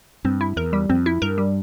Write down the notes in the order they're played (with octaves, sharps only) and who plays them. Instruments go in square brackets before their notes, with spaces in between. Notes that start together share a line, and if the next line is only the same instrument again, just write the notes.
[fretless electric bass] G2 [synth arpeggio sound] C4
[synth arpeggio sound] E4
[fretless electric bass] E2 [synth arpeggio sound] A#4
[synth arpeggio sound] G3
[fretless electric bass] F2 [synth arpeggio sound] C4
[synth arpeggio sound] E4
[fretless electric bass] G2 [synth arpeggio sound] A#4
[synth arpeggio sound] G3